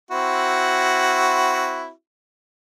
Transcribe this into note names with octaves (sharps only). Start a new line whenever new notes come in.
C4 E4 F#4